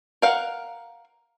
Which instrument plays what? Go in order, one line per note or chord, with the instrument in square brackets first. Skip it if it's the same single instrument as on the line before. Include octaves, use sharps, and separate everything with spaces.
[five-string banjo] A#4 F5 F#5